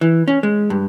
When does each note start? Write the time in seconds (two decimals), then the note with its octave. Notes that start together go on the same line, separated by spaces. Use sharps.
0.01 E3
0.28 C#4
0.43 G#3
0.70 G2